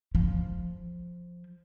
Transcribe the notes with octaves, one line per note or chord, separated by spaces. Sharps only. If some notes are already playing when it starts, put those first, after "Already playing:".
F3